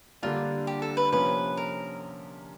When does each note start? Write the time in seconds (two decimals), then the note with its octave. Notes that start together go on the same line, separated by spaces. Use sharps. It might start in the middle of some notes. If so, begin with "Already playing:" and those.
0.23 D3 G3 A#3 D4 F4
0.67 G4
0.82 A4
0.97 B4
1.12 C3 F3 A#3 C#4 B4
1.57 A#4